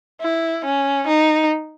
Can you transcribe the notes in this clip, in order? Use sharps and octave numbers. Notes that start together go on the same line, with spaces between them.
E4
C#4
D#4